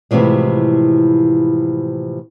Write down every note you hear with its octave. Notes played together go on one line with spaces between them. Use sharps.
A2 C3 E3 F3 G#3